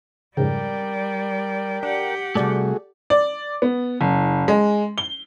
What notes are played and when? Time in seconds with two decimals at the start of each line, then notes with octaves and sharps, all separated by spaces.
0.37 F2 G#2 C#3 G3 A#4 D5 G5
1.83 D4 G4 F#5
2.35 C2 G#2 A3 F#4 G#4 A4 D5
3.10 D5
3.62 B3
4.01 F#1
4.48 G#3
4.98 G7